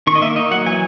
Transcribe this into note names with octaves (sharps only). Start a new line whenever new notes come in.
D#3 C#6
D#5
A#3 E5
D#4 D#5
F#3 F#5
E3 G#5